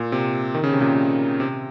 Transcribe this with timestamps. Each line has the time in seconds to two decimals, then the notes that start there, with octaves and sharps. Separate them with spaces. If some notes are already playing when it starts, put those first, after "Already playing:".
Already playing: A#2
0.12 C3
0.55 D#3
0.64 C#3
0.73 C3
0.80 A#2 C#3
1.40 C3